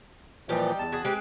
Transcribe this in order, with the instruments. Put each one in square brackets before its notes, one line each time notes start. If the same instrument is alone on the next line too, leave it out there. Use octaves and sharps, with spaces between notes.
[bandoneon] A#2 E3 F3 [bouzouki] G3 D#4 G4
[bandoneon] E2 A5
[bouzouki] F#4 G#4 B4
[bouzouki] G#3 C4 B4 [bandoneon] G4